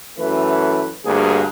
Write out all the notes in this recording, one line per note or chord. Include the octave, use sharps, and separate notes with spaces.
F#2 E3 A3 B4
D2 G2 A#3 G#4